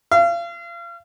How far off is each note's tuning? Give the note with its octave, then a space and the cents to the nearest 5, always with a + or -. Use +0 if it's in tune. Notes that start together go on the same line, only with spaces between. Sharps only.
F5 -35